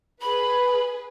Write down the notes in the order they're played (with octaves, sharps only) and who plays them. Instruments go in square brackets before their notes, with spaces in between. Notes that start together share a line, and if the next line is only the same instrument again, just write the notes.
[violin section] G#4 B4 [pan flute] B5